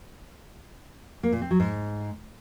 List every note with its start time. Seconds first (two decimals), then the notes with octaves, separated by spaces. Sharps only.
1.23 A#3
1.32 A#2
1.42 C4
1.51 F#3
1.60 G#2